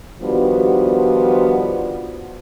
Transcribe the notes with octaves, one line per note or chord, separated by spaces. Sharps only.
D#3 F3 G3 B3 D4 F#4